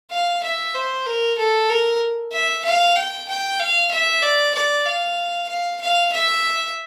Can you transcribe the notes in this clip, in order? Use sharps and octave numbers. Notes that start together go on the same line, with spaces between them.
F5
E5
C5
A#4
A4
A#4
E5
F5
G5
G5
F5
E5
D5
D5
F5
F5
F5
E5